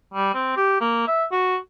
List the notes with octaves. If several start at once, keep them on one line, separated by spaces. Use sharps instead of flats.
G3
C4
G4
A#3
E5
F#4